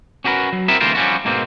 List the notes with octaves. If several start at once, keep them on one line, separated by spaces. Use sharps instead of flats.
C#4 F#4 G4 A#4 B4
F#3
B3 C4 E4 A#4 E5
D2 C3 E3 F4 A#4 C5
F3 G3 C#4 F4 F#4
G#2 B2 A#3 C4